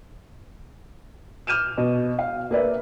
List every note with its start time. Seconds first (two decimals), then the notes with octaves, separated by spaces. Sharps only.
1.47 D6 F6 G6 D#7 E7
1.78 B2
2.19 F5
2.51 A#3 B4 D5 E5